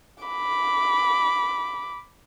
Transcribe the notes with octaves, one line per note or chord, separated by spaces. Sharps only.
B5 D6